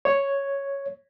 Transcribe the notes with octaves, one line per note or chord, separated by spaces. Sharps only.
C#5